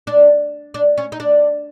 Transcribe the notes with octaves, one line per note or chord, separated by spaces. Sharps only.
D4
D4
C#4
D#4
D4